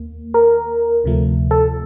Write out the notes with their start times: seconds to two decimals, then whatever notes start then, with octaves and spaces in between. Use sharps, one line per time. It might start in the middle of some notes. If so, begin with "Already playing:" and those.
Already playing: D#2 A#3
0.34 A#4
1.04 D2 C3 F3 A3
1.51 A4